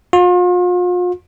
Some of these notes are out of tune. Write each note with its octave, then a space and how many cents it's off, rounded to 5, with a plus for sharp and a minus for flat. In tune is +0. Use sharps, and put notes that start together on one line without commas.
F4 +40